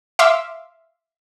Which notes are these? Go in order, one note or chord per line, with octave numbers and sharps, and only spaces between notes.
E5 F5 C6 D6 E6